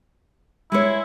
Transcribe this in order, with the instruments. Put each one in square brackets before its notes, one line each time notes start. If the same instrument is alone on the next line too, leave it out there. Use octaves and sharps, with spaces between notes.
[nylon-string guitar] G#3 G#4 C#5 [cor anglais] E4